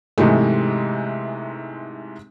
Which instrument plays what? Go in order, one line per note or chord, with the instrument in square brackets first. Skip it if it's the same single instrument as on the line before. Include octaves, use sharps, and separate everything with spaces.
[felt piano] G#2 C3 E3 G#3 A3